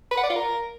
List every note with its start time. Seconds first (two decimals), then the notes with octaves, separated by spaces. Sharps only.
0.11 B4
0.18 F#5
0.24 D5
0.30 F4
0.36 A#4